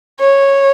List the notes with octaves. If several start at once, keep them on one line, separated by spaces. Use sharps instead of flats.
C#5